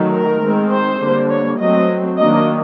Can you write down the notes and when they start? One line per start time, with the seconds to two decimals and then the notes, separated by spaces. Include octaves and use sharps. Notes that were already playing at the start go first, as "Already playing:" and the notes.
Already playing: D#3 F#3 A3
0.10 A#4
0.40 D#3 G#3 C4
0.70 C5
1.00 D3 G3 A#3
1.29 C#5
1.59 F#3 A3 C4 D#5
2.18 D#3 F#3 A#3 D4 D#5